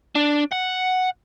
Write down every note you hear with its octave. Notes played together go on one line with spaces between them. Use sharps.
D4
F#5